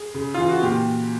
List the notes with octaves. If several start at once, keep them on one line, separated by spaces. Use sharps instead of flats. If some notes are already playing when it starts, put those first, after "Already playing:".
Already playing: G#4
C#3
E3 F4
F#4
A#2 G4